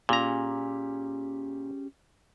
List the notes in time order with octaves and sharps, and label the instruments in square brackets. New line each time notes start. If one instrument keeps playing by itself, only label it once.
[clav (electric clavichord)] A#2 A#5 [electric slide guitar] C#4 G4 G#4